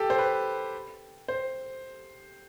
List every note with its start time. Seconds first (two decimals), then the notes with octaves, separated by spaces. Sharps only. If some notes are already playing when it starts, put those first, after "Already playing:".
Already playing: G4 A4
0.10 C5
0.18 B4
1.28 C5